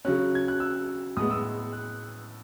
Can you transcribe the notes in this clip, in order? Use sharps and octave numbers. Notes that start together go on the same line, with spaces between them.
C#3 F#3 C#4 F#6
G#6
F#6
E6
A2 G#3 B3 D#6
E6
F#6